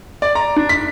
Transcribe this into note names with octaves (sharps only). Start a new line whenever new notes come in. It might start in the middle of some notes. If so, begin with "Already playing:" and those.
D5
A#5
D4
B6